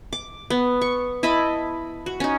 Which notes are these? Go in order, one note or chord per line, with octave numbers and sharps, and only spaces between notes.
D6
B3
C#6
E4 D#5 A5 B5
F#4
C#4 D#4